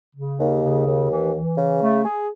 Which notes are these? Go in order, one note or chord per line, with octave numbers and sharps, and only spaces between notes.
C#3
D#2
C#3
D#2
E3
E3
C#3
A3
G#4